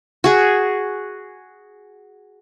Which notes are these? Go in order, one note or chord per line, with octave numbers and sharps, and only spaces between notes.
F#4 G#4